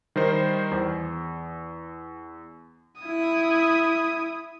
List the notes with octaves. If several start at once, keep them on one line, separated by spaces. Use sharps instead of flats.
D#3 G3 A#4 C5
E2
E4 D#6